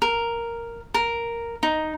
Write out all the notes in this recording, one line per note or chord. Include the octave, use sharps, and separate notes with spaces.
A#4
A#4
D#4